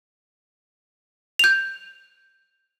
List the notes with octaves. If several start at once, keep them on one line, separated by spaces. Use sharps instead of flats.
G6 F7